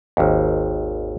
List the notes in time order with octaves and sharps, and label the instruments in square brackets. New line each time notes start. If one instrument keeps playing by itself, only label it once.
[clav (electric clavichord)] G#1 D#2